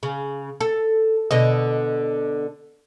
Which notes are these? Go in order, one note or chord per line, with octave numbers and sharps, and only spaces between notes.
C#3
A4
B2 D3 D#5